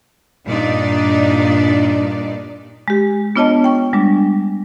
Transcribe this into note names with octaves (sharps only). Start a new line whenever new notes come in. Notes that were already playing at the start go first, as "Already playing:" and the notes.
G2 A#2 D4 D#4 D5
G#3 G4
B3 D4 F4 C#5 D#5 A5
G5 C#6
G3 G#3 D4